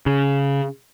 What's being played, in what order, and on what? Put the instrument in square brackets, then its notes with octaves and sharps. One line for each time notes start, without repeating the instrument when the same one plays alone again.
[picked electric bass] C#3